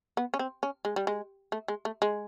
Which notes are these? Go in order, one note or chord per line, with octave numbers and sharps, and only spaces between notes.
B3
C#4
C4
C#4
G#3
G3
G#3
A3
G#3
A3
G#3